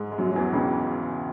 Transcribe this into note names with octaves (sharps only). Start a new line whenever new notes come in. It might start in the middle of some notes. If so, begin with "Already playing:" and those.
Already playing: G#2 G#3
G#3
F#2 F#3
F#3
E2 E3
C#2 C#3